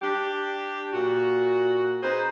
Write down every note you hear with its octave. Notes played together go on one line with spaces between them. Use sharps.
D4 G4
A#2 F#4
D#4 G#4 B4 C5